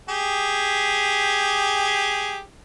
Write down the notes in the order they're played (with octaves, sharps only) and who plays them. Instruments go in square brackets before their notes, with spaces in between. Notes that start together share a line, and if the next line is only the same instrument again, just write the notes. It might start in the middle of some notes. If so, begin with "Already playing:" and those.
[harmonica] G4 G#4